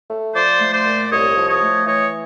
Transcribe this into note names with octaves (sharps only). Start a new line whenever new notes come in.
A3
F3 C5 D5
A3
C5 D5
A#2
C2 C#5 D#5
F3
C#5 D#5
A3
E3 C#5 D#5